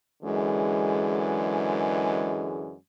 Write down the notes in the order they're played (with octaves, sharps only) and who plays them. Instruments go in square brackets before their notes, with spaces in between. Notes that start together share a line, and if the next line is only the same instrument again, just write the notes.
[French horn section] F#2 D3 E3 G#3